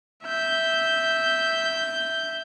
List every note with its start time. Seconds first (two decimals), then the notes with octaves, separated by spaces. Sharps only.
0.25 E5 G6